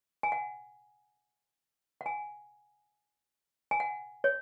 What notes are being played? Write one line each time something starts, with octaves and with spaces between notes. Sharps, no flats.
G#5
F#5
F#5
G#5
G#5
F#5
C#5